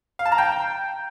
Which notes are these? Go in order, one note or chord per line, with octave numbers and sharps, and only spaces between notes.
F5
A5
A#5
G5